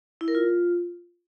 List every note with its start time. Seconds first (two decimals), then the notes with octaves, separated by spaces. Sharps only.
0.21 E4
0.28 A#4
0.35 F4